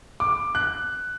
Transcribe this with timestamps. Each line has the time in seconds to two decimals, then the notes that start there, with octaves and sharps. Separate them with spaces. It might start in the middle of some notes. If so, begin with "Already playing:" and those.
0.20 D6
0.55 F#6